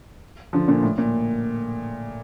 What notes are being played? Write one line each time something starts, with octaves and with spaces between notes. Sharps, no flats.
D3 F3
A#2 D3
A2
A#2